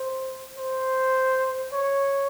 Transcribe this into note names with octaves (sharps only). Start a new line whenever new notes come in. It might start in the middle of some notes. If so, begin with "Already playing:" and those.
Already playing: C5
C5
C#5